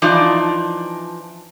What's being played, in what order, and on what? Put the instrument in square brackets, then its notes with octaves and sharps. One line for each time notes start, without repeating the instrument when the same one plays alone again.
[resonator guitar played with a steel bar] E3 F3 D4 D#4 D5